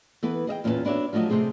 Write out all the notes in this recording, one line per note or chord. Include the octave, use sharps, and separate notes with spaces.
E3 B3 A4 B4
G#4 D#5 E5 G5
E2 A#2 C#4 A4 B4 A5
B3 D4 F#4 C#5 E5
F3 F#3 A3 F#4 D#5
C3 A3 C4 G#4